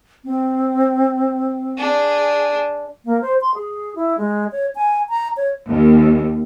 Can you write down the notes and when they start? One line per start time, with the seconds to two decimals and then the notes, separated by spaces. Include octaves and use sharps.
0.24 C4
1.78 D4 G#4
3.05 A#3
3.21 C5
3.41 C6
3.55 G#4
3.95 E4
4.18 G#3
4.52 C#5
4.75 G#5
5.09 A#5
5.37 C#5
5.67 D#2